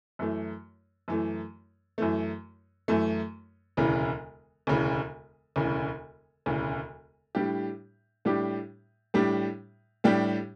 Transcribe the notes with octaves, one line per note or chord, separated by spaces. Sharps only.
F#2 E3 A3
F#2 E3 A3
F#2 E3 A3
F#2 E3 A3
E1 D2 C#3 E3
E1 D2 C#3 E3
E1 D2 C#3 E3
E1 D2 C#3 E3
A2 G3 D4 G4
A2 G3 D4 G4
A2 G3 D4 G4
A2 G3 D4 G4